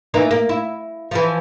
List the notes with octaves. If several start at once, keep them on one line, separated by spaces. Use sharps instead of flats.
E3 A#3 D#4
A#3
E4
E3 F3